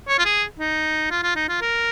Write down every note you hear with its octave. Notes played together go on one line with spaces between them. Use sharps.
C#5
F4
G#4
D#4
F4
F4
D#4
F4
A#4